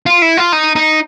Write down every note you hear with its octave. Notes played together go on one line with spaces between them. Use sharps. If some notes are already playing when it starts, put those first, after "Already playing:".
F4
E4
F4
D#4
D#4